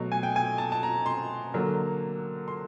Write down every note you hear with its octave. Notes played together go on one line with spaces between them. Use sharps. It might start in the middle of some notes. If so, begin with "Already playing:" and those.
Already playing: B2 F#3 A3
G#5
G5
G#5
A5
A5
A#5
C6
D3 F#3 A#3
C6